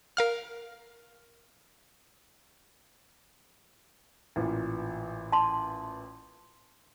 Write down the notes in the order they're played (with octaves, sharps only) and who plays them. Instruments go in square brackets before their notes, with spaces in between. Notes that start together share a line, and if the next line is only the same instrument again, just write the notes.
[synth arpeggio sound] A#4 F5 F6
[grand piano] A1 A#2 E3
[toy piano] A5 C6